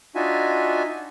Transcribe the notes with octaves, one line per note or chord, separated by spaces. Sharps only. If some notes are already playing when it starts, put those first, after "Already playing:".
D4 D#4 F4 F#4 E5 G#5